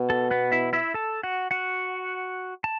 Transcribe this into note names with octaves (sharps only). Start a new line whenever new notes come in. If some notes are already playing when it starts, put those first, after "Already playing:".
Already playing: B2
A4
B3 B4
E4 E5
E4 E5
A4 A5
F#4 F#5
F#4 F#5
A5